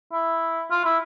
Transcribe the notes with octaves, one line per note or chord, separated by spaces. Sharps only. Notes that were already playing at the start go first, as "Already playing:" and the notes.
E4
F4
E4